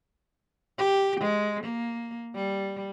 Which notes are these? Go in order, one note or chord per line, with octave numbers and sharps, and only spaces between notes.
G4
G#3
A#3
G3